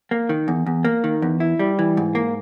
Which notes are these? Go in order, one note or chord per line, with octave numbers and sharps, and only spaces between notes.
A#3
D#3
E2
E2
A#3
D#3
E2
E4
G3
E3
G#2
A#3